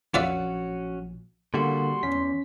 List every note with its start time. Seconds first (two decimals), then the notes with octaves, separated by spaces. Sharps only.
0.14 A#1 F#3 C#4 F4 F#4 D5 E5
1.54 A#2 D3 G3 A#3 F#4 C6
2.03 E2 C#4 B6